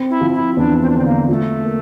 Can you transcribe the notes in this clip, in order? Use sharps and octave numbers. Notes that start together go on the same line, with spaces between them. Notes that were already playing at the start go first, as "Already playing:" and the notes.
Already playing: C4
E4
F3
E4
E2 D4
C4
D4
D3 C4
A#3
A3 F4
A#3